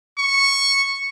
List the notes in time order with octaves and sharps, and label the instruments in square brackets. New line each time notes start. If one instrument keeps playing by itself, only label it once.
[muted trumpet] C#6